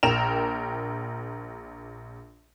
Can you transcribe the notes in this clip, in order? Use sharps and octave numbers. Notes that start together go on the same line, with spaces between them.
A#1 A#4 G5 E7 F7